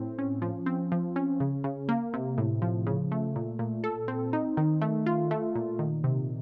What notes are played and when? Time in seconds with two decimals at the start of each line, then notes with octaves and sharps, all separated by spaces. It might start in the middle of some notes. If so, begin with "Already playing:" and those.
Already playing: A2 C4
0.19 C#4
0.42 F3
0.66 C4
0.92 F3
1.16 C#4
1.40 C#3
1.64 C#3
1.89 A#3
2.14 C3
2.38 A2
2.62 F3
2.87 C#3
3.12 A3
3.36 A#2
3.59 A#2
3.84 A4
4.08 C4
4.33 D#4
4.57 D#3
4.82 A3
5.06 F4
5.31 A3
5.55 A#2
5.79 D#3
6.04 C3